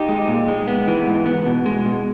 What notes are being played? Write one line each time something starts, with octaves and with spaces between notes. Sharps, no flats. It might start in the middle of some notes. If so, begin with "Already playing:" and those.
Already playing: D#4 G4
G#3
A#2
G#3
B3
E3
G#2
B3
B2
G#3
B2